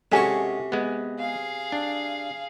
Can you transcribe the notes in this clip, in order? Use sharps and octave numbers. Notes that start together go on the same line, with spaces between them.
C3 G#3 C#4 F#4 A4 G#5 C#6
G#3 B3
G#4 F5
D4